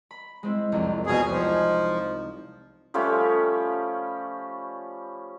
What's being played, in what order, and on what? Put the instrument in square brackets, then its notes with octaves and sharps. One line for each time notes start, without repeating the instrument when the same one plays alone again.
[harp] B5
G#3 C4 E4
F#1 C2 F2
[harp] E2 F5 [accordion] B2 G#4
[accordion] F3 [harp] D#4 G4
[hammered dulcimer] F3 G3 A3 C#4